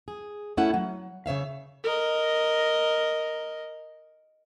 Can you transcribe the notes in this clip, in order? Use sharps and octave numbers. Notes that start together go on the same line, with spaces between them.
G#4
A3 C#4 E4 F#5
F#3
C#3 C#5 E5 F5
A#4 D#5